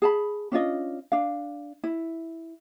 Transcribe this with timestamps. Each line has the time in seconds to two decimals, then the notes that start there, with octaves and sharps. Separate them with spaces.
0.02 G#4 A5 B5
0.52 C#4 D4 F4 D#5
1.12 D4 F5
1.84 E4